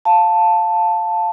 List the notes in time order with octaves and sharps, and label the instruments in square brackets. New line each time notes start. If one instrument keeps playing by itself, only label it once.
[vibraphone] F5 A5